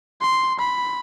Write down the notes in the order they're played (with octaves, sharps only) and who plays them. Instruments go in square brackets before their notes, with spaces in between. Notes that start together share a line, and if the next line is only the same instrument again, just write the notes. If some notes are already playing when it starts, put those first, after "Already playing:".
[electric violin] C6
B5